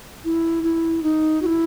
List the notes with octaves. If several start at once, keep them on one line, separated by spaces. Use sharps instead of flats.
E4
E4
D#4
F#4
E4